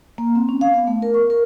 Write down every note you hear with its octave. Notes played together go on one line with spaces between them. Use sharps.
A#3
C4
C#4
F5
B3
A3
A#4
C#6
A#4